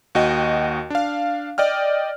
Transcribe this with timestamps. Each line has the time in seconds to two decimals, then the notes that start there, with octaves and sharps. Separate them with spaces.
0.15 D#2 F#4 D#5 G5
0.90 D4 F5
1.58 D5 D#5 G5 F6